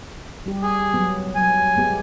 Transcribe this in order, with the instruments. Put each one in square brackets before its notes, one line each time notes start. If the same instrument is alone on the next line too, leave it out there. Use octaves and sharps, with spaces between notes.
[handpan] G3 G4
[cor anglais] G#4
[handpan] F#3 B3
[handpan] F#3 [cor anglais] G#5
[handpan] G#3 B3 G4